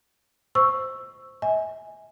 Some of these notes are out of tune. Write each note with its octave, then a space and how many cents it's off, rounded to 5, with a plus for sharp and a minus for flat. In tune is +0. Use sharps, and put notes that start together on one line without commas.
C5 +0 C#6 +0 E6 +0
E5 -40 G#5 +0